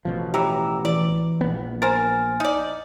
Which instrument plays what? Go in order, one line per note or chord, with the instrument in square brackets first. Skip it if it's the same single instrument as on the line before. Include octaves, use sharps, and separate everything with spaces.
[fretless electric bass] A1 B2 F3
[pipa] E3 F#3 [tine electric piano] G4 A#5 E6
[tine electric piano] E3 [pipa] D5
[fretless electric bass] A#1 B3
[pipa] A#4 C5 [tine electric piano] G#5 F6 A6
[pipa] D#4 D5